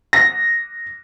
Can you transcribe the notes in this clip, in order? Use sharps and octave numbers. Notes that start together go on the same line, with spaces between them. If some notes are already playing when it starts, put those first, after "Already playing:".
A#6